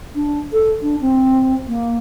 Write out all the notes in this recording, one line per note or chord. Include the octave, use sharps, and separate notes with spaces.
D4
A4
D4
C4
A#3